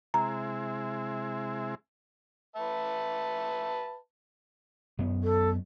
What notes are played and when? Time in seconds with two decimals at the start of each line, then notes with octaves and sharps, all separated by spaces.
0.14 C3 G#3 E4 A#5
2.56 B4 E5 A5
4.99 F#2 B3
5.23 A4